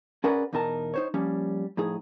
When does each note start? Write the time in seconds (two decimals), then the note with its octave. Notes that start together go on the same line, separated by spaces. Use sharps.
0.24 C#4 G#4 A#4 B4 D5 F#5
0.53 E2 B2 D#4 A#4 A5
0.94 D#4 C5 C#5
1.14 F3 G3 A#3 C#4
1.77 A2 F3 D#4 G#4